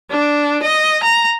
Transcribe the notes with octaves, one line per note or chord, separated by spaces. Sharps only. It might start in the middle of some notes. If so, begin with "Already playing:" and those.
D4
D#5
A#5